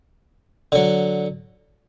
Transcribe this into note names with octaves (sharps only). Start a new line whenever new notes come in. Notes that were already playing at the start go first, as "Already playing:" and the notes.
D3 F#3